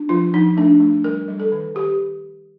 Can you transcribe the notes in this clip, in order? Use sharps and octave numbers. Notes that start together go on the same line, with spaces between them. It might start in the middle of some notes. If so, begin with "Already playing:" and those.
Already playing: D4
F3 F4
F3 D#4
A3 D4
A3
G3 A#4
G3
A4
D#3
D#3 G4